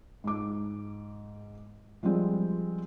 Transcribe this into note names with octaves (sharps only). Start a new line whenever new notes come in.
G#2 D6
F3 G3 G#3 C4